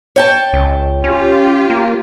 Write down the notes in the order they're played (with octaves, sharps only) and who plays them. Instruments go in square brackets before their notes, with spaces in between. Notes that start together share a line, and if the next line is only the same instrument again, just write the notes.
[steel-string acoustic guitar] C#5 G5 A5
[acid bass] C#2
[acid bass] C#4 [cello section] F4 G4
[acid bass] A#3